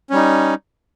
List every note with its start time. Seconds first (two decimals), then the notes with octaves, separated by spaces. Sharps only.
0.10 C#4
0.13 G3
0.16 D#4